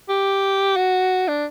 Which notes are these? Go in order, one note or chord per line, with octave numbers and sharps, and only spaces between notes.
G4
F#4
D4